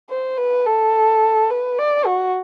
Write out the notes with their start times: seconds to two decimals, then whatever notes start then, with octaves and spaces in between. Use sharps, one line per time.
0.10 C5
0.38 B4
0.66 A4
1.50 B4
1.78 D5
2.06 F#4